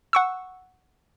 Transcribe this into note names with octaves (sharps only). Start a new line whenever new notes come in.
F#5 C#6 E6